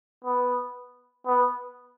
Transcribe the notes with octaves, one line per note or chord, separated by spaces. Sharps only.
B3
B3